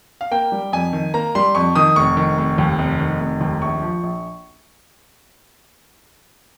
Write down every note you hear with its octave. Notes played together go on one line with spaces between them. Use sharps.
F5
A#3 G5
G3
F2 G#5
D#3
A#3 A#5
G3 C6
F2 C#6
D#3 D#6
F1 C#6
D#3
F1
D#2
F1
D#3
F1
D#2
A#1 C#6
F3
A#1